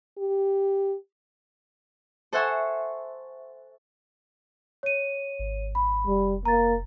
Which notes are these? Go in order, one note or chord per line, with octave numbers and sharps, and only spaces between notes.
G4
A4 C5 E5 F#5 G#5 C#6
C#5 D#7
G#1
B5
F1 G3
A#3 A#5 A6